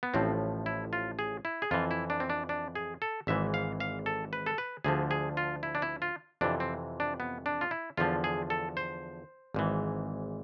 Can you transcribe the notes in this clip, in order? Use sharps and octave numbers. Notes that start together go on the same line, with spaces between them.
B3
A1 A2 F3 C4
E4
F4
G#4
E4
G#4
F2 E3 F4
E4
D4
C4
D4
D4
G#4
A4
G#1 G#2 E3 E5
F5
F5
A4
B4
A4
B4
D2 D3 F3 G#4
G#4
F4
E4
D4
E4
F4
F2 C3 E3 D4
C4
D4
B3
D4
F4
E4
E2 D3 F3 F4
G#4
A4
C5
G#1 G#2 E3